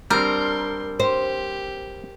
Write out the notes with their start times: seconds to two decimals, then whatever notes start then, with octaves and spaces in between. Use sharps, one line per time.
0.10 G3 C4 D4 A#4 C6
1.00 G4 C5